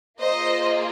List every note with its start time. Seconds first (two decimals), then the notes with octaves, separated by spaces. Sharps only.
0.19 A#3 F4 G#4 C5 D#5